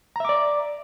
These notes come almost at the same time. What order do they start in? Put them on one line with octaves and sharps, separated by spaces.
A#5 E5 D6 D5